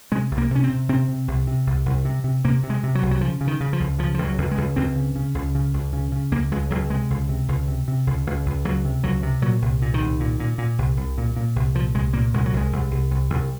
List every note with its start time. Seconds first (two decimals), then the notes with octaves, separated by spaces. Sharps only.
0.12 C3 G#3
0.31 C2
0.38 A#3
0.51 C3 C#4
0.64 C4
0.69 C3
0.89 C3 C4
1.09 C3
1.28 C2
1.47 C3
1.67 C2
1.86 C2
2.05 C3
2.24 C3
2.45 C3 A#3
2.63 C3
2.70 G#3
2.83 C3
2.95 F#3
3.03 C2
3.11 F#3
3.21 C#3 F3
3.41 C#3
3.47 D#3
3.61 C#3
3.73 F3
3.80 C#2
3.99 C#3 F3
4.14 C#2 F3
4.25 F#3
4.38 C#2
4.51 G#3
4.58 C#2
4.76 C#2 C4
4.96 C#3
5.16 C#3
5.35 C#2
5.55 C#3
5.74 C#2
5.93 C#3
6.12 C#3
6.31 C#2 A#3
6.51 C#2 G#3
6.71 C#2 F#3
6.90 C3 G#3
7.10 C#2
7.29 C3
7.48 C#2
7.68 C3
7.88 C3
8.07 C#2
8.27 C#2
8.46 C#2
8.65 C#2 F#3
8.85 C3
9.04 C#2 F#3
9.23 C3
9.42 A#2 F#3
9.62 C2
9.82 A#2
9.94 D#3
10.00 C2
10.20 A#2
10.40 A#2
10.58 A#2
10.78 C2
10.97 C2
11.18 A#2
11.36 A#2
11.56 C2
11.75 A#2 F3
11.95 C2 G#3
12.13 A#2 A#3
12.34 C2 G#3
12.46 F#3
12.53 C2 G#3
12.72 C2
12.91 C2
13.11 C2
13.30 C2